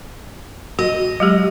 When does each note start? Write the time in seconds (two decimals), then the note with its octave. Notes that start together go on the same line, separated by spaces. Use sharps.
0.79 F#4 D#5
1.20 F#3 G#3 G4